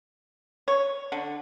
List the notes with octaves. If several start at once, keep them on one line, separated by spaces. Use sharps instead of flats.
C#5
D3